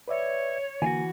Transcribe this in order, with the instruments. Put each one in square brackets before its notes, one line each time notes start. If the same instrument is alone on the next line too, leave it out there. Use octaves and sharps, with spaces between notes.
[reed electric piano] B4 D5 E5 [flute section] C#5
[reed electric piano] D3 A#3 [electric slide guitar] E3 F4 F#4 [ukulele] G#5